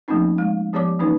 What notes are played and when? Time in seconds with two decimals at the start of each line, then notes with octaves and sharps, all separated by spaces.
0.08 F3 A3 A#3 C4 C#4 D#4
0.38 G#3 F5
0.73 F3 B3 G4 C#5 D5 D6
0.99 E3 A#3 C#4 D#4 B4